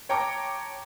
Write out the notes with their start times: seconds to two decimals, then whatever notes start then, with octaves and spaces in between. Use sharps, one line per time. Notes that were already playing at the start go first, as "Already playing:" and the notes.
0.09 C#5 G5 A5 A#5 D6